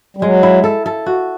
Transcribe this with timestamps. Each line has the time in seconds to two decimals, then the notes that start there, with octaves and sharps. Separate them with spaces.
0.17 G3
0.22 F#3 G#3
0.43 E4
0.64 A4
0.86 A4
1.06 F#4